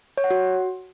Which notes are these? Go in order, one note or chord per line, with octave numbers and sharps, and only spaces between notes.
C#5
F#5
F#4